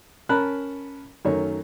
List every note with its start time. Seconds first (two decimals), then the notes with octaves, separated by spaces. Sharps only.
0.29 C#4 A#4 A5 B5 F#6
1.25 F#2 D#3 A3 C#5